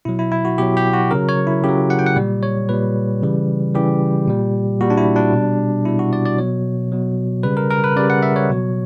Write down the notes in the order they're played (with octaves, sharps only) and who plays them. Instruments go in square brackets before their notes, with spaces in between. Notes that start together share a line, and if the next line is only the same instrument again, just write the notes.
[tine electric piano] B2 F#3 E4
E4
E4
F#4
B2 F#3 G4
G4
F#4
C#3 F#3 A#4
C#5
E4
C#3 F#3 G4
F#5
G5
F#5
A#2 G3
C#5
A#2 G3 B4
C#3 E3 G3
C#3 E3 G3 G4
A#2 G3
A#2 G3 F#4
D4
E4
D4
B2 G3
B2 G3 E4
F#4
D5
D5
B2 F#3 C#5
B2 F#3
C#3 G3 B4
A#4
A#4
B4
C#3 G3 D5
F#5
E5
C#5
B2 F#3